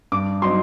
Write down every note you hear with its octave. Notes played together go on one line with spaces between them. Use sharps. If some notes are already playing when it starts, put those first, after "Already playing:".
G2 D6
F#3 C4 D#4 C6